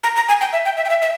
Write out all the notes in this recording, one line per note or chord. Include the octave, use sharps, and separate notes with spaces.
A#5
A#5
G#5
G5
E5
G5
E5
G5
E5
E5